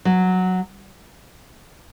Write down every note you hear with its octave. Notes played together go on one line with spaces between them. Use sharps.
F#3